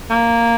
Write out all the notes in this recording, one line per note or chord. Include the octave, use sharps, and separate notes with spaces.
A#3